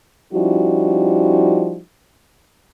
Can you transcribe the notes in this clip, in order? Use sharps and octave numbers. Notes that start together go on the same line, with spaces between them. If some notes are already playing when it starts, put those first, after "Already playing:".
F3 G3 C#4 D#4 E4 F#4